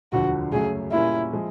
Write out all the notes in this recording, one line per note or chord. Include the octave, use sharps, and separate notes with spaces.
E1 D2 D3 F3 F#4
F#2 C#3 F#3 A3 G#4
A#2 G3 A#3 C#4 E4
F3 G#3